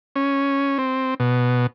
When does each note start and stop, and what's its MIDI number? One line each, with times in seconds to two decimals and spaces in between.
0.16 0.78 61
0.78 1.14 60
1.20 1.67 47